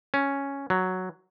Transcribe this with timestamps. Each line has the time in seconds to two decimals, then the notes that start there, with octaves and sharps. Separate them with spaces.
0.14 C#4
0.70 F#3